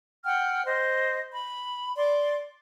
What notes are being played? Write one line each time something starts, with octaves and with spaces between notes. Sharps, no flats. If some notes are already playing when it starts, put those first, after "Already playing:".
F#5 G5 F6
C5 D#5
B5
D5 C6